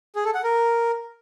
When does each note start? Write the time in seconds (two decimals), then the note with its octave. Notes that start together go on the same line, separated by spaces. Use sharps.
0.15 G#4
0.25 A4
0.34 F#5
0.44 A#4